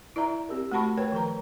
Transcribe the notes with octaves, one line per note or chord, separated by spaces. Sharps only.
E4 D5 E5 A#5
C4 G4 A#4
A3 F#4 F#5 A5 B5 C#6
A#4 B4 C#5 G5
D#3 F3 A#4 A#5